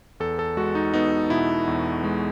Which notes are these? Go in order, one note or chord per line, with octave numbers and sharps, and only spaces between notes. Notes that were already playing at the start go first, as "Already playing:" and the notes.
E2 A4
A4
G#3 F#4
D#4
B3 D#4
B2 E4
E2
G#3